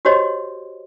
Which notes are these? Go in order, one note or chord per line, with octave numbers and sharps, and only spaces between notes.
F#4 G4 C5 C#5 D#5